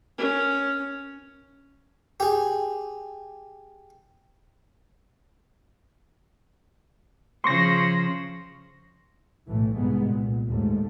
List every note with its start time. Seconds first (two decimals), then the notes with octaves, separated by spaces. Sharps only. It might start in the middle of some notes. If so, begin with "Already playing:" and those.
0.18 C#4
2.20 G4 G#4
7.44 C#3 F3 C6 C#6 A#6
9.47 B1 A2 E3 A3
9.76 C2 G#2 G#3 B3
10.06 A#2
10.48 D#2 G#2 A3